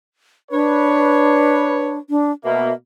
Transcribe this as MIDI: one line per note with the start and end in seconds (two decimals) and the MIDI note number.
0.52 1.98 62
0.52 1.97 71
0.52 1.97 73
2.10 2.32 62
2.45 2.71 47
2.45 2.71 58
2.45 2.73 76